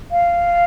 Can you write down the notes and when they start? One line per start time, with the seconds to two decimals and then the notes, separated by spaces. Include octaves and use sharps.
0.12 F5